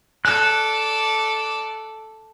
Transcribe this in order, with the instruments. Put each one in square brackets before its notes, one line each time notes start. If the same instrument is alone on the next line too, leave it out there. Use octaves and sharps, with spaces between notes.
[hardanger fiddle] A4 D5 [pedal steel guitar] F#6